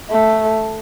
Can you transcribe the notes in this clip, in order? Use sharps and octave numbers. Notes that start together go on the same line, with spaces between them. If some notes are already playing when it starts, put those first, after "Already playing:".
A3